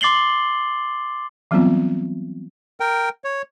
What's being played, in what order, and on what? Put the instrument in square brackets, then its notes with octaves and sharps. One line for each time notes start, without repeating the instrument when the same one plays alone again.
[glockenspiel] C6 D6 A6 C7 F#7 G7
[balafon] E3 F#3 G3 B3 C4 F4
[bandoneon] A#4 G5
C#5